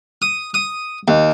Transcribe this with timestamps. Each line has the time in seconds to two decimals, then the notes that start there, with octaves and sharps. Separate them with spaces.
0.22 D#6
0.54 D#6
1.08 D#2